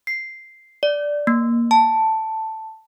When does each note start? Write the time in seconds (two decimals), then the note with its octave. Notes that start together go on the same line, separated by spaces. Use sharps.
0.07 C7
0.83 D5
1.27 A#3
1.71 A5